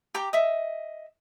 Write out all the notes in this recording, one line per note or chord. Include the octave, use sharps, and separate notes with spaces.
G4 G5 A#5 D6
D#5 E5